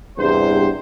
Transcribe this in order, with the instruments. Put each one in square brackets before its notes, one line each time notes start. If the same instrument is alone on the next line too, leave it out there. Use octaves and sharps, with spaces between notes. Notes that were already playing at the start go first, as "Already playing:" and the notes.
[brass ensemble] E2 G2 C3 C5